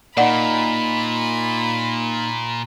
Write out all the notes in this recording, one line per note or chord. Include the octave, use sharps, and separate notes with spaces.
A#2 A#3 D#4 D5 F#5 B5